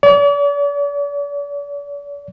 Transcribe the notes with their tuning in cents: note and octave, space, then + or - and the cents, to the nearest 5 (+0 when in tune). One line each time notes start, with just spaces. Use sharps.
D5 -45